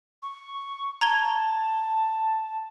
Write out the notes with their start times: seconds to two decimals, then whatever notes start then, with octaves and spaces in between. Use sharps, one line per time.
0.23 C#6
1.01 A5 A#5 G#6 G7